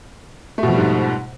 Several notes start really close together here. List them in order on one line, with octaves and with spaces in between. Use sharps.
A3 B2 F2 G3 G#2